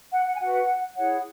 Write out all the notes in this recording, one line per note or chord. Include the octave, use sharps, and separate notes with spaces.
F#5
F#5
G#5
F#4 B4 F#5
E4 G#4 C#5 F#5